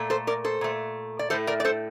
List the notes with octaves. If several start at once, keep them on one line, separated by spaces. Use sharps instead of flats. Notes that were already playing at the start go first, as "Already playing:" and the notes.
Already playing: A#2 A3
A4 C5
A#4 D5
A4 C5
A#2 A3
D5
A2 A3 A4 C5
A#4 D5
D5
A4 C5